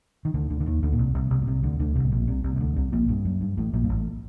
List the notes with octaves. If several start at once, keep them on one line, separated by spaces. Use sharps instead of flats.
D#3
D2 D3
D2 D3
D3
D#2 D#3
D2 D3
A#2
C2 C3
C2 C3
C2 C3
A#2
C2 C3
D2 D3
D2 D3
C2 C3
A2
A#1 A#2
C2 C3
C2 C3
C3
D2 D3
C2 C3
A#1 A#2
G2
F#2
G2
A1 A2
A#1 A#2
G2
A1 A2